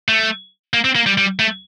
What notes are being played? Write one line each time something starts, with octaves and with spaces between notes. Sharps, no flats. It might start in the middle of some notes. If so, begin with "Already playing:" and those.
A3
A#3
C4
A#3
G3
G3
A3